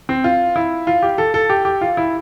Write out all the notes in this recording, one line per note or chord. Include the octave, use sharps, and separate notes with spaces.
C4
F4
E4
F4
G4
A4
A4
G4
G4
F4
E4